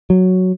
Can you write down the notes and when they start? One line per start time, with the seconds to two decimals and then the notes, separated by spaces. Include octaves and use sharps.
0.10 F#3